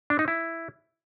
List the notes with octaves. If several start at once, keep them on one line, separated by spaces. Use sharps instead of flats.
D4
D#4
E4